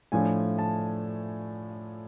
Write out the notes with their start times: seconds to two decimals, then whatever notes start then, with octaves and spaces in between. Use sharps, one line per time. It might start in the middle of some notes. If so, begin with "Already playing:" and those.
0.12 A2 F3 A3 D4 G#5
0.58 A5